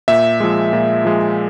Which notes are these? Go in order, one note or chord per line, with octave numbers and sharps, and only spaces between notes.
A#2 E5
F3 G#3
A#2
F3 G#3